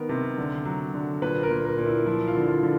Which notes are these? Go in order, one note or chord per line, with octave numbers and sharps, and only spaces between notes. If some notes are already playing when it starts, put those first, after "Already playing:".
Already playing: D#3 B3 A#4
C3
D3
F#3
D3
A#2 B4
A#4
A#2
A#4
A#2
E4
F3 E4
F4
D3
F4
D3